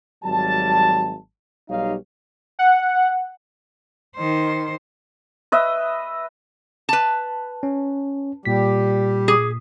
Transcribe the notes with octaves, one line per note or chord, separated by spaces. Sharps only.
G#1 F#3 G3 A5
B1 G3 D#4 G4 C#5 F5
F#5
D#3 C5
B4 D#5 E5
B4 A5
C#4
A#2 G3 G4 B6
G#4